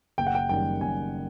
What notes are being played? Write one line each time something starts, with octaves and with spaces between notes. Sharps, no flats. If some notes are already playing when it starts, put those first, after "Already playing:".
F#1 G5
F#5
G5
F#2 D#3 G3 G5
F#1 G#5